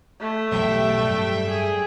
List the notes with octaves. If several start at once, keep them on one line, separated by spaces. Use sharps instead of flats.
A3
E1 B1 G3 E5 G5
G2 F#3
G#4